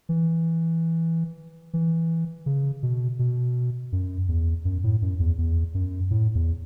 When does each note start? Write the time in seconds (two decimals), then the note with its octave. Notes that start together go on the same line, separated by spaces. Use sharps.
0.09 E3
1.73 E3
2.46 C#3
2.83 B2
3.19 B2
3.92 F#2
4.29 E2
4.65 F#2
4.84 A2
5.02 F#2
5.20 E2
5.38 E2
5.74 F#2
6.11 A2
6.35 E2